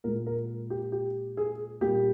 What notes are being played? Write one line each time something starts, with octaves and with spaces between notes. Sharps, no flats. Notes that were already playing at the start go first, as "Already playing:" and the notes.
A#2 G#3 A#4
A#4
G4
G4
G#4
A#2 G3 A#3 G4